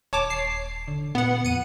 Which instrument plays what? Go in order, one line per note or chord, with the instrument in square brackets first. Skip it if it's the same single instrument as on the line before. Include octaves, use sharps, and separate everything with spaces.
[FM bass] D#1 [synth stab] C#5 A5 D6
[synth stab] C7
[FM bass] D3
[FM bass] A#2 [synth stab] B3 F#5
[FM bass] F2 [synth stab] C#7 D#7